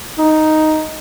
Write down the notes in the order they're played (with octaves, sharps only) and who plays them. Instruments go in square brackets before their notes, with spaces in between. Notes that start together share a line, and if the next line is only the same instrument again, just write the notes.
[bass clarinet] D#4